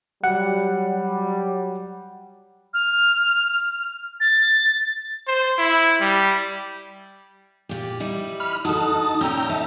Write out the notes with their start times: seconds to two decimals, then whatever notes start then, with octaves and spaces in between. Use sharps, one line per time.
0.24 F#3 G3 F#5
2.74 F6
4.20 A6
5.27 C5
5.58 E4
6.01 G3
7.69 A#2 G4
8.00 G3 D#4 E4
8.40 B5 F6
8.65 D#4 F#4 A4 A5 D#6
9.21 A#2 C#4 G5 A#5 E6
9.49 D#4 E5 A5